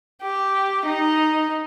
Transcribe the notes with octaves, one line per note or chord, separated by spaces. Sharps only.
G4
D#4